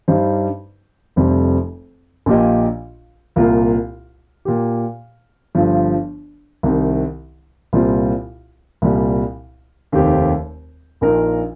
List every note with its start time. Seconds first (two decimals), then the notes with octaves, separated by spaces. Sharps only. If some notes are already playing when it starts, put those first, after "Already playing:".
0.08 G2 G3 D#4 C5
1.16 F1 F2 C3 G3
2.26 A#1 A#2 A#3 G4 D#5
3.36 C2 A#2 A#3 F4 A#4
4.45 A#2 A#3 G4
5.55 G1 G2 F3
6.63 C2 C3 D#3
7.73 C2 A#2 G3 C4 F4
8.82 C2 A#2 G3
9.92 F1 D#2 D#3 C4 G4
11.01 A#1 A#2 A#3 D#4 A#4